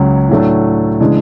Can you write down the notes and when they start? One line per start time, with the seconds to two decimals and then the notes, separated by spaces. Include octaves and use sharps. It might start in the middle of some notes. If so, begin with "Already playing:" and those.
Already playing: C#2 C#3 F#3
0.29 A2 F#3 A3 D4
1.00 C#3 E3 G#3 D4